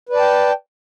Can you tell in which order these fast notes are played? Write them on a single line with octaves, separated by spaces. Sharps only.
B4 D5 A5 G5